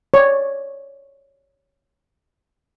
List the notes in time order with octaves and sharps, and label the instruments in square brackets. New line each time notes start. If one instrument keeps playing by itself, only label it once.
[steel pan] C#5 D5